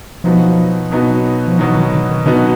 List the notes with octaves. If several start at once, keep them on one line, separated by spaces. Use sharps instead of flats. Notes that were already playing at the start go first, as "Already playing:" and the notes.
B2 F3 F#3 B3 D#4 F#4
B2 F#3 B3 D#4 F#4
F3
B2 E3 F#3 B3 D#4 F#4
D#3
D3
D#3
B2 D3 F#3 B3 D#4 F#4